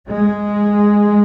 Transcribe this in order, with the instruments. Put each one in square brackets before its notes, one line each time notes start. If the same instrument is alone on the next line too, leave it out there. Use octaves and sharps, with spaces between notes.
[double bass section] G#3